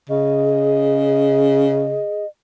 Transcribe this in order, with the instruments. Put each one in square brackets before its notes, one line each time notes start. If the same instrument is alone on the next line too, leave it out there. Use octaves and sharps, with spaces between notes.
[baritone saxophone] C#3 [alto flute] G#4 [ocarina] D#5